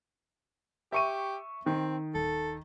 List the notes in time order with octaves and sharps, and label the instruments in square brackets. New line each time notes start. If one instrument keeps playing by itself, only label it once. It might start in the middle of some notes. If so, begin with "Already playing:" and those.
[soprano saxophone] G4 [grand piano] E5 C#6 D#7
[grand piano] D#3 [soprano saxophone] C4
[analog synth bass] D#1 [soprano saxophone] A4